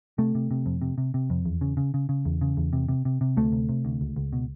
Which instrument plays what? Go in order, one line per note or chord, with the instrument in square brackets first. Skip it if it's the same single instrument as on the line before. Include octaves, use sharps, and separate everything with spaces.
[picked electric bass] C3 A3
C3
C3
F2
C3
C3
C3
F2
E2
C#3
C#3
C#3
C#3
E2
C#3
E2
C3
C3
C3
C3
D2 A3
C3
C3
D2
C#2
C#2
B2